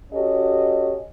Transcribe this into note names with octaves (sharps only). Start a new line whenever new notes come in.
C#4 F#4 G4 A4 D#5